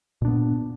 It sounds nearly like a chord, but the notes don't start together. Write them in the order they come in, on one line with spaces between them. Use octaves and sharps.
A#2 D4 B3